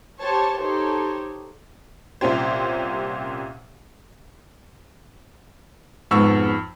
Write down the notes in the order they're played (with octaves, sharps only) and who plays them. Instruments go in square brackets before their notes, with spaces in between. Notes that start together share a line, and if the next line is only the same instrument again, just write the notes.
[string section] G4 C5 C#5 A5
D#4 G4 A4 C5 C#5
[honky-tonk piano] C2 A#2 C#4 G4 C5
[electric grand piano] F2 C#6 E6 [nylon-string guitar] G#2 B2